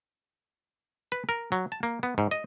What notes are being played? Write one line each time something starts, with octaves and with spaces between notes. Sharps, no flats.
B4
A#4
F#3
A5
A#3
B3
G#2
D#5